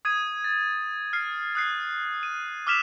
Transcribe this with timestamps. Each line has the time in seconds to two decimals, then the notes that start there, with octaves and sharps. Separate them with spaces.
0.05 D#6 G#6 D#7
0.44 A6
1.13 F6 C7
1.55 D#6 F#6 C7
2.23 D#7
2.67 D6 E6 F6 B6 E7 F7